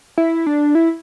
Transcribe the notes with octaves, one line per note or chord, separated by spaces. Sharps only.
E4
D4
E4